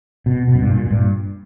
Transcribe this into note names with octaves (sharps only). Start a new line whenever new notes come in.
B2
B2
F#2
G2
A#2
A#2
G2